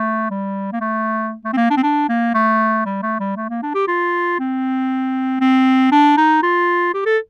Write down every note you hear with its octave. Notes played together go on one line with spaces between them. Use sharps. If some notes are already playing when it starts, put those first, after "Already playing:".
Already playing: A3
G3
A#3
A3
A3
C4
A#3
D4
C4
D4
A#3
A3
G3
A3
G3
A3
A#3
D4
G4
F4
C4
C4
D4
D#4
F4
G4
A4